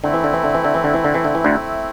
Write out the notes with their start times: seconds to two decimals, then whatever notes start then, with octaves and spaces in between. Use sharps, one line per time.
0.04 D3 A3 C4 E4
0.14 E3
0.24 D3
0.33 E3
0.44 D3
0.54 E3
0.65 D3
0.74 E3
0.84 D3
0.94 E3
1.04 D3
1.14 E3
1.24 D3
1.35 E3
1.44 D2 D3